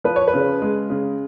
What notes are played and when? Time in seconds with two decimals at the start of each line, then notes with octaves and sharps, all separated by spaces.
0.04 F3 B4
0.16 C#5
0.28 B4
0.34 C#3
0.62 G#3
0.90 C#3